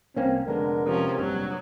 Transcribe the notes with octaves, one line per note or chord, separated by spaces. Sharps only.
C2 A#3 C4 C#4
F1 D3 G#3 B3 A#4
C3 F3 C#4
F1 A#1 G2 F#3